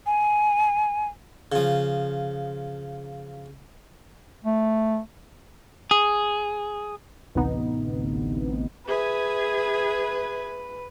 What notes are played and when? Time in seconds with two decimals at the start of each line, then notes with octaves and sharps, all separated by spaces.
0.06 G#5
1.52 C#3 F3
4.44 A3
5.91 G#4
7.35 A1 D2 C3 B3 D#4
8.87 G#4 B4 E5 G#6